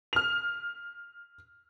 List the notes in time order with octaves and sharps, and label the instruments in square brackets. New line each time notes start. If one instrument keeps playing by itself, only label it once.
[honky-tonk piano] F6 F7